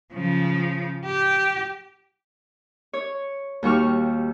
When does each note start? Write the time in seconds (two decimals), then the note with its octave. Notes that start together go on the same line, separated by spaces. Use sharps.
0.13 C#3 F3
1.05 G4
2.93 C#5
3.63 D#2 G3 F#4 C#6 F6